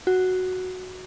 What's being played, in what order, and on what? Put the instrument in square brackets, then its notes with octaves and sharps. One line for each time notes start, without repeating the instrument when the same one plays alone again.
[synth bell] F#4